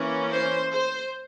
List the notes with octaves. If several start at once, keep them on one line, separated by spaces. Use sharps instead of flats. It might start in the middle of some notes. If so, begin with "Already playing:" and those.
Already playing: E3 A#3 C#4
C5
C5